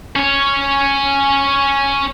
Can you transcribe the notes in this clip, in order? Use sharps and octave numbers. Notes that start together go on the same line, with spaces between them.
C#4 C#5